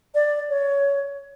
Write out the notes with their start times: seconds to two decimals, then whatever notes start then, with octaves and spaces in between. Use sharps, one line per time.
0.15 D5
0.50 C#5